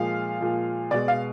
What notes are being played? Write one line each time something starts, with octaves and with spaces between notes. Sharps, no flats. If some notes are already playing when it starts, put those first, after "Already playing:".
Already playing: A#2 F3 G#3 F5
A#2 F3 G#3
B2 G#3 D5
F5